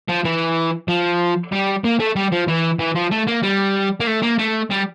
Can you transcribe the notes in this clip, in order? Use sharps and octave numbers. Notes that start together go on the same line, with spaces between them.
F3
E3
F3
G3
A#3
A3
G3
F3
E3
E3
F3
A3
A#3
G3
A#3
A3
A#3
A3
G3